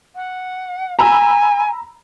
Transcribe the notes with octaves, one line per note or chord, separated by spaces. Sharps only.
F#5
G#5 A#5 B5 E6